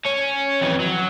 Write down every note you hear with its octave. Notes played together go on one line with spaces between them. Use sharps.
C#4
F2 E3
F#3